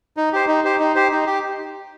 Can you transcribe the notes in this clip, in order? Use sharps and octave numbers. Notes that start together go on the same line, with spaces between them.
D#4
G4 C5
D#4
G4 C5
D#4
G4 C5
D#4
G4